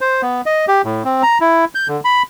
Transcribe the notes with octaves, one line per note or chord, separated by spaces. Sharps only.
C5
B3
D#5
G4
A2
C4
A#5
E4
G6
D3
B5